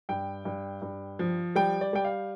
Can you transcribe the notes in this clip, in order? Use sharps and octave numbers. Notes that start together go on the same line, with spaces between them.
G2 G5
G2
G2
F3
G3 G5
D5
G3 G5
F5